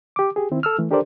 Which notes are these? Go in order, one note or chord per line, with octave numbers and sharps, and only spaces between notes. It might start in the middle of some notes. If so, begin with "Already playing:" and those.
G4 D6
G4 G#4
D#3 C4 E4
A4 E6 F6
E3 A3
D4 G4 A4 A#4 C5 D5